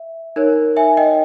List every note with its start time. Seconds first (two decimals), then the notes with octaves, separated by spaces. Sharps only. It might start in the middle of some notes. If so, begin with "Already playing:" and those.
Already playing: E5
0.36 D#4 A#4 C#5
0.77 E5 G#5
0.97 D#5 G5